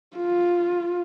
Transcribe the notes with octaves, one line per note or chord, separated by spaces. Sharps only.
F4